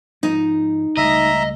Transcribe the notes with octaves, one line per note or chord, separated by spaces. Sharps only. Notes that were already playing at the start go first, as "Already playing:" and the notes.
G#2 F3 D#4
C#2 G3 A3 D#5 E5 A#5